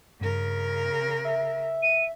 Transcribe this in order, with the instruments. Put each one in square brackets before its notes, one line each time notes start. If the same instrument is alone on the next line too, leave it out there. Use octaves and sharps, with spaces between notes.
[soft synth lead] G2 [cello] C#3 A#4
[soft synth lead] E5
[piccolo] D#7